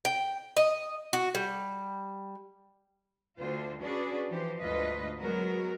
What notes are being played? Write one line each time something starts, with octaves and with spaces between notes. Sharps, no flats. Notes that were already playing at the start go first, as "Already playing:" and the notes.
G5
D#5
F#4
G3
D2 D3 F4 C5
C#4 D4 F#4 G#4 B4 D5
E3 F3 G4 C5
D2 G#2 F4 B4 D#5
F#3 G#3 B3 F#4 A#4